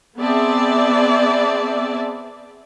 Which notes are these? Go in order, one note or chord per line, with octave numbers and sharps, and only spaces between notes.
B3 C4 G#4 D5 E5 A5